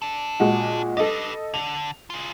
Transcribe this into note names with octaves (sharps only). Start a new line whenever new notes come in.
D4 A4
A#2 G#3 F#4
G4 A4 B4 D#5
D3 F7
F4 G#4